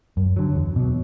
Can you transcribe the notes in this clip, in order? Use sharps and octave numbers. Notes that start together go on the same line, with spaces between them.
F#2
D3 F#3
E2
B2 F#3